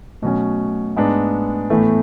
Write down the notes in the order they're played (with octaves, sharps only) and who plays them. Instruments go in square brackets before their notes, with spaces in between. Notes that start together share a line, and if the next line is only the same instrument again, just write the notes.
[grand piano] B2 F#3 C#4 [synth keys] A3
[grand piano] G#2 G#3 B3 D4
[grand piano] A2 E3 A3 [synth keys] B3